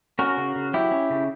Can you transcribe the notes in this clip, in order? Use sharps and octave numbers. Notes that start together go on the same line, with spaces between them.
C#4 F#4 A#4
C#3
C#3
F#3 E4 G4
C#4
C#3